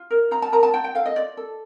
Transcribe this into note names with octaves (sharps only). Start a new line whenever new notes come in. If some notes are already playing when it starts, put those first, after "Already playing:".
Already playing: F4
A#4
F4 A#5
A5
A#4 A#5
A5
F4 G5
G5
A4 F5
D#5
F4 D5
A4